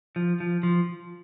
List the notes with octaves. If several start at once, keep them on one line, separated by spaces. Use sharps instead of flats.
F3
F3
F3